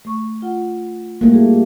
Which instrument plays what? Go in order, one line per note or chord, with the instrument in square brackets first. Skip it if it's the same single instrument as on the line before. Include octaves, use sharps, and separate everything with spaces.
[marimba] A3 C#6
F4 F#5
[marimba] G3 E4 F#4 [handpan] A3 A#3
[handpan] G3 [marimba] G#4